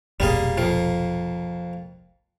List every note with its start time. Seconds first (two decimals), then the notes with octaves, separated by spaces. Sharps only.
0.20 F1 B1 A#2 G3 A#3 G#4
0.58 F2 A#3